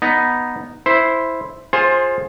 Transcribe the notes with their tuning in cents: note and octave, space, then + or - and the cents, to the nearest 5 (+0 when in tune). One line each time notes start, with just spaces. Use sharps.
B3 +0 D#4 +0
E4 +0 C5 +0
F4 +0 G#4 +0 C5 +20